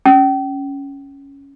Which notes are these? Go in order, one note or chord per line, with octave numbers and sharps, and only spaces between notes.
C#4